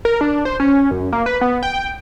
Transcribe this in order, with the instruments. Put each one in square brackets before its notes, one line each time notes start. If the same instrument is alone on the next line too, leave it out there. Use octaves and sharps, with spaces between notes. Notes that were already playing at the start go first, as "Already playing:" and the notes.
[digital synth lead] A#4
D4
C5
C#4
F#2
A#3
B4
B3
G5